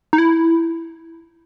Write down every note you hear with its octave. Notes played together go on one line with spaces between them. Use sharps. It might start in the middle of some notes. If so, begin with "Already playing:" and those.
D#4
E4